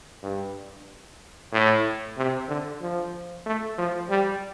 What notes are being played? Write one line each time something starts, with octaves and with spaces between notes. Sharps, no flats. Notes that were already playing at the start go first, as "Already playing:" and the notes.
G2
A2
C3
D3
F3
A3
F3
G3